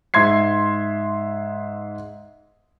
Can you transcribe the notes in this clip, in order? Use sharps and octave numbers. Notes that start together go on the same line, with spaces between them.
G#2 E5 C6 G#6 C7